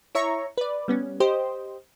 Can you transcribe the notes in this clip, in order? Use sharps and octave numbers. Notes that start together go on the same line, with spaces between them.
E4 C#5 E5 A#5 C#6
B4 D5
G3 B3 C#4
G4 C5 D#5